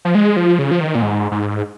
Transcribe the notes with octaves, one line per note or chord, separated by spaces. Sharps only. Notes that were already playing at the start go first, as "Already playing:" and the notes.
F3
G#3
F3
C#3
F3
D#3
A#2
G#2
G#2